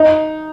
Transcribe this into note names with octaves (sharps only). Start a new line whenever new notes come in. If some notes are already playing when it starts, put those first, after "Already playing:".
Already playing: D#4